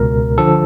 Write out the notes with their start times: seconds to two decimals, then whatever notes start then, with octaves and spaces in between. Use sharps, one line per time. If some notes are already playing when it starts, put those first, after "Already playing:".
Already playing: C#2 B2 A#4
0.38 D3 F3 A4